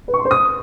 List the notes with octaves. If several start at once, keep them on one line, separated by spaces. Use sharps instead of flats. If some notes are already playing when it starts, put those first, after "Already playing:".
B4
C#6
C6
C5
D#6